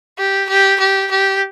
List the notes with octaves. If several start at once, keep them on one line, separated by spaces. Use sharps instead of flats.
G4
G4
G4
G4